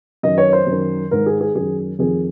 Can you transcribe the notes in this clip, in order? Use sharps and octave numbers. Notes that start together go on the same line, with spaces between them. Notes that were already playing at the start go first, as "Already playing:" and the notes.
F#2 D#3 D#5
C#5
C5
F#2 D#3
G#2 D#3 A#4
G#4
G#4
F#2 D#3 G#4
F2 D#3 G#4